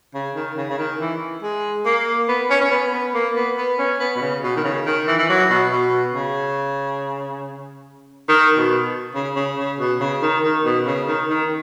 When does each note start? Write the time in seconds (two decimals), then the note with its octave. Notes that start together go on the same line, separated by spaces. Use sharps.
0.14 C#3
0.35 D#3
0.57 C#3
0.70 C#3
0.78 D#3
0.99 E3
1.42 G#3
1.85 A#3
2.28 B3
2.50 C#4
2.61 C#4
2.71 B3
2.93 B3
3.14 A#3
3.35 B3
3.57 B3
3.78 C#4
3.99 B3
4.16 B2
4.21 C#3
4.43 B2
4.56 D#3
4.64 C#3
4.86 D#3
5.07 E3
5.18 E3
5.29 F#3
5.50 B2
5.71 B2
6.14 C#3
8.29 D#3
8.57 B2
9.15 C#3
9.36 C#3
9.57 C#3
9.79 B2
10.00 C#3
10.22 D#3
10.43 D#3
10.65 B2
10.86 C#3
11.08 D#3
11.29 D#3